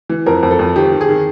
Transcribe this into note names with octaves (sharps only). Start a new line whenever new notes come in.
E3
F2 A#4
F2
A4
F2
D#3 G4
D#3
G#4
D#3